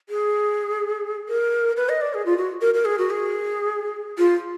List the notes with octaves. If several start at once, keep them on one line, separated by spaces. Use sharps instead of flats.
G#4
A#4
B4
D#5
D5
G#4
F4
F#4
A#4
A#4
G#4
F#4
G#4
F4